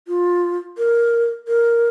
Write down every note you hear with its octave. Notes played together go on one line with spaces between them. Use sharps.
F4
A#4
A#4